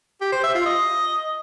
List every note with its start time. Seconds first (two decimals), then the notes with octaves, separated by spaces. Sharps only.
0.21 G4
0.32 C5
0.44 E5
0.55 F4
0.66 D#5